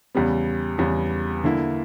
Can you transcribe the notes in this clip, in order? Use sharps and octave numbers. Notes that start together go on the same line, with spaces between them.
E2 C#3 G3 B3
E2 C#3 G3 B3
D3 A#3 E4